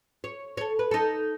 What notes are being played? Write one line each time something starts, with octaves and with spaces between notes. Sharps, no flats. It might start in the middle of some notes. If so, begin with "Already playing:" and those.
C#5
A4 C#5
B4
D#4 A4